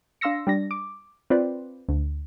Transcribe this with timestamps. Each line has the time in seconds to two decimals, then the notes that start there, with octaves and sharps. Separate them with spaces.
0.21 D4 F5 C6 E6 A#6 C#7
0.47 G3 D4 A#6
0.71 D6
1.30 C4 F4 B4 C5 D5
1.89 D2